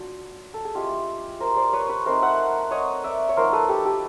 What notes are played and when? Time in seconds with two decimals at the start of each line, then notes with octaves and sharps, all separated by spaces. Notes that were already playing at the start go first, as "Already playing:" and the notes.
Already playing: F#3 B3 D4 F4
0.54 A4
0.65 G#4
0.75 G#3 C#4 E4 F4 G4
1.40 A#4 C5
1.56 C5 D5
1.73 B4 C#5
1.89 B4 C#5
2.05 A3 C4 D#4 A#4 C5
2.22 E5 F#5
2.71 C#5 D#5
3.04 D5 E5
3.29 C#5
3.36 F3 A#3 D#4 A#4 C5
3.53 A4 B4
3.69 G4 A4
3.85 G4 A4